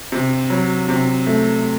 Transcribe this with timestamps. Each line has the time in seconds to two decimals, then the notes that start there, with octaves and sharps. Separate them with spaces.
0.12 C3
0.50 F#3
0.89 C3
1.27 A3